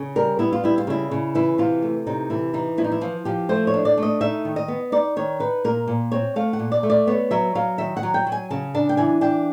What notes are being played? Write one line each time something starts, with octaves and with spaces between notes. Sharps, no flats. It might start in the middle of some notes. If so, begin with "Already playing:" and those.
Already playing: C#3
G3 A#4
B3 E4
F4
G3 E4
F4
C#3 E4
C#3
E3 E4
C3 F4
A3
C3 D#4
E3 E4
E3 D#4
F3 E4
D#4
E4
F3 F4
F3 G4
A3 C5
C#5
D4
D5
A3
D#5
D#4 E5
D#3
D#5
B3
D#4 D5
D#3 C#5
D#4 B4
A#2 A#4
A#2
C4 C#5
A3 F5
F#5
A#2
D5
A3
D5
B3 C#5
F#3 E5
F#3 F5
D#3 E5
F#5
F#3
G5
F#3
G#5
C#3 A5
D4 A5
G5
E3 G#5
D4 G5